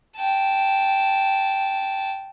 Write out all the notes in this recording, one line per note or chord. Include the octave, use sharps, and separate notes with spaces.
G5 A5